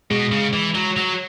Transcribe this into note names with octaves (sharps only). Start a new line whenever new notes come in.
B2 G#3
C#3
E3
F#3
F#3